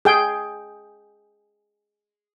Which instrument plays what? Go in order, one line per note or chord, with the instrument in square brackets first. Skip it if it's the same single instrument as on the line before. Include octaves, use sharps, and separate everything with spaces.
[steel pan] G#4 G5